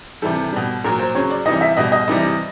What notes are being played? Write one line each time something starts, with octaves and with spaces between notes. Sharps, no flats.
C3 E3 G3 A4
B2 G3
A#2 F#3 A#4
C5
C#3 F#3 C#5
D5
C3 E3 G3 D#5
E5
B2 G3 D#5
D#5
C3 E3 G3